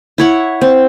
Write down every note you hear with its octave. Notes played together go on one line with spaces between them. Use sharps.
E4 C#5 F#5
C4